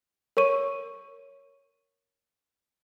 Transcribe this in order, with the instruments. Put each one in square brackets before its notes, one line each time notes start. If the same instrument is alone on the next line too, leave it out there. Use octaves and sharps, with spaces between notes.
[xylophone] A#4 C#5 C#6 D#7